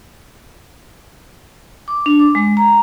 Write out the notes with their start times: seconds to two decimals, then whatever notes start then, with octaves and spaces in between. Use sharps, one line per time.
1.88 D6
2.06 D4
2.19 D6
2.35 G#3
2.57 A#5